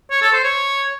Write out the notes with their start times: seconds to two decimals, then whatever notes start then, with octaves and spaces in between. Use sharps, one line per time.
0.11 C#5
0.22 A4
0.33 C5
0.44 C#5